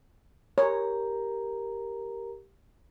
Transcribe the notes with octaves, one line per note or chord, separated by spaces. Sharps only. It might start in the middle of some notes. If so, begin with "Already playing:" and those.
G4 A#4 C#5 A#5